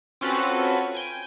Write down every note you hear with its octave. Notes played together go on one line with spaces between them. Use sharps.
C4 C#4 F4 F#4 A4 B4
G5 G#5